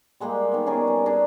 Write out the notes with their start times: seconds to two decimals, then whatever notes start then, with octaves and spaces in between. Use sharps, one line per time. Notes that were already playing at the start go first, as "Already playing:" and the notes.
0.20 G3 G#3 A#3 G4
0.52 D#3 B3
0.66 C#4 D4 G#4 A#4
0.87 G3
1.06 D4 G#4 A#4